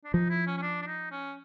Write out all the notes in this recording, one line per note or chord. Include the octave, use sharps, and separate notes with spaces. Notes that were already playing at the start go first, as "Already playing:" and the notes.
D4
F3 D#4
E4
C#4
C#4
D4
D4
D#4
C#4